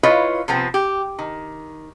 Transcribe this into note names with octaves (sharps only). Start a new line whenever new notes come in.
E4 F4 B4 C#5 D#5 F5
C3 F3 B3 C4
G4
D#3